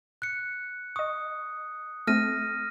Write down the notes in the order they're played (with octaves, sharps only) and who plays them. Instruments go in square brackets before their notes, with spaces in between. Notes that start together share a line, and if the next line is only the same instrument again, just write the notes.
[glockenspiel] F#6 C#7
[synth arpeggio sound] D#5 C#6 [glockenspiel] D#6
[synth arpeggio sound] A3 C4 [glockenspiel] F6 A#6 D#7